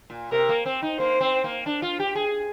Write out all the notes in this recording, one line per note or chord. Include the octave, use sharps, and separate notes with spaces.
A#2
C3 A#4
A#3
C4
D#4
A#3 C5
C4
A#3
D4
F4
G4
G#4